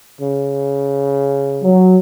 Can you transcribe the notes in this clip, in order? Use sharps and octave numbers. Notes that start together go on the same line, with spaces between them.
C#3
F#3